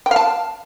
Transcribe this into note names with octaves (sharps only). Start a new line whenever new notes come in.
G5
F5
A5